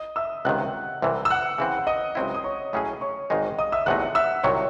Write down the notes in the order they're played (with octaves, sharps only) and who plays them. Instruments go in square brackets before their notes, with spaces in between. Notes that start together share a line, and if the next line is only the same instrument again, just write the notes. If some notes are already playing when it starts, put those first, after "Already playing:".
Already playing: [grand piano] D#5 D#6
E5 E6
[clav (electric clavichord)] C#2 C3 D#3 [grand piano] F#5 F#6
[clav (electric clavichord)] C2 C3 E3
[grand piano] E6
F#5 F#6
[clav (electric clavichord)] C#3 E3 C4
[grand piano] D#5 D#6
[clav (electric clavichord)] C#2 C3 F#3 C4 E4
[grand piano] D#6
C#5 C#6
[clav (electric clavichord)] A2 F#3 C#4 G#4
[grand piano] C#5 C#6
[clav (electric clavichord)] G#1 G#2 D#3 G#3 D#4
[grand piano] D#5 D#6
E5 E6
[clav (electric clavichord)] E2 C3 F#3 A3 D#4 [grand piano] F#5 F#6
[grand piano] E5 E6
[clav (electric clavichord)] C2 C3 D#3 F#3 [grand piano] C#5 C#6